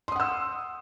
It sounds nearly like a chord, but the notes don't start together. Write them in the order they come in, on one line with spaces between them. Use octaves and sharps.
C6 D#6 F#5 E6